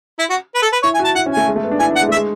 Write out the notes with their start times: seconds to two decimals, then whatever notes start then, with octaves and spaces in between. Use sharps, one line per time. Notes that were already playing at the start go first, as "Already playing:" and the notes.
0.19 E4
0.30 F#4
0.55 B4
0.62 A4
0.73 B4
0.83 E4 C#5
0.94 G#5
0.99 F#4
1.05 A5
1.15 E4 F#5
1.26 C#4
1.31 G#5
1.37 A3
1.48 G#3
1.56 A3
1.64 B3
1.71 D4
1.80 E4 G#5
1.90 D4
1.96 F#5
2.01 G#3
2.09 A3
2.12 E5
2.16 G#3